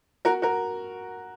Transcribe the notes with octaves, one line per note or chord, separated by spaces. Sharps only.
F#4 A#4
F#4 A#4